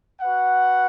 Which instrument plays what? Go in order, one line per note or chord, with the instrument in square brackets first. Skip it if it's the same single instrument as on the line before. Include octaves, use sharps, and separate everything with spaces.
[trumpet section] F#4 B4 F#5